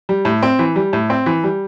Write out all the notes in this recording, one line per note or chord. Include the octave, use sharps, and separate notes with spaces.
G3
A2
C4
E3
G3
A2
C4
E3
G3